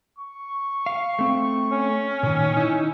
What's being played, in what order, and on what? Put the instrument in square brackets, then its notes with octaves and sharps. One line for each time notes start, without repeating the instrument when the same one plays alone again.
[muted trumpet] C#6
[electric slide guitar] F5
A3 C4
[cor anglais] C#4
[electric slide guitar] A#2 D#3
D#4 E4